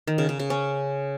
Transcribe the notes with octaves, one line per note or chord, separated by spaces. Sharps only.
D#3
C#3
C#3
C#3
C#4